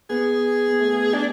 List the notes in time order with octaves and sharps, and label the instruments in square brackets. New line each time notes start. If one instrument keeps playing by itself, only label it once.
[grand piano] B3 [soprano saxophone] G#4
[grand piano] B3
A3
B3
[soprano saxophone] D4